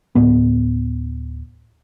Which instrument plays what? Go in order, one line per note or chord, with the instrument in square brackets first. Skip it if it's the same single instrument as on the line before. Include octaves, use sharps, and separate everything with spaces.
[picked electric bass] D1 A2 B3